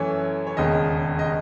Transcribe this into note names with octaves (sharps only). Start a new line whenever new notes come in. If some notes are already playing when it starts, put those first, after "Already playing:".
Already playing: F#2 E3 A3 C#5
C#5
E1 D#2 C#3 D#5
D#5